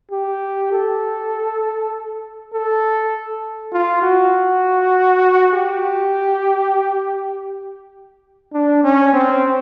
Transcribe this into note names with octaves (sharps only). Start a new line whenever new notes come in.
G4
A4
A4
F4
F#4
G4
D4
C#4
C4